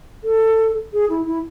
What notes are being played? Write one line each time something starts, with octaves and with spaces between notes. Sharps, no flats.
A4
G#4
E4
E4